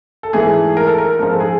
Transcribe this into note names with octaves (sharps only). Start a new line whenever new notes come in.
A4
G#2 E3 A3 G#4
A#4
A4
A#4
G#2 F3 G#3 A#4
A4
G#4